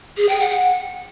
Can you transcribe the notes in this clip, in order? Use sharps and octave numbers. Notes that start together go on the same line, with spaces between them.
G#4
G5
F#5